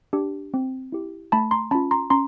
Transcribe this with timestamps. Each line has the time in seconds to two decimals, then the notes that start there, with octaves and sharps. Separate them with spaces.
0.13 D4 G4
0.54 C4
0.92 E4 G4
1.32 A3 A5 B5
1.51 A#5 C6
1.71 C#4 F4 A5 B5
1.91 A#5 C6
2.10 C#4 A#5 C6